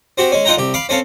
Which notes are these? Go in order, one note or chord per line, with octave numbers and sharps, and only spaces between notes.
C4 F#4 G4
G#3 C#4
D#4 F4 F#5 G5 A#5
C2 G4
F5 B5 D6
C4 C#4 A4 F5